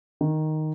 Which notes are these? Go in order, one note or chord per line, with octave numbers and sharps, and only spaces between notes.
D#3